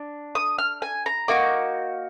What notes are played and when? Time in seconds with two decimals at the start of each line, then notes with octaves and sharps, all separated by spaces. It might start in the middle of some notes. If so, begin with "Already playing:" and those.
Already playing: D4
0.35 D#6
0.58 F6
0.82 G#5
1.06 A#5
1.28 A#3 D#4 F#4 D6